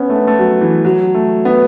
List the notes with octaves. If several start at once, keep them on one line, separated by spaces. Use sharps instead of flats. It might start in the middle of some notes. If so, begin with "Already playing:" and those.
Already playing: B3 C#4
A3
B3
A3
F#3
E3
F#3
A3
B3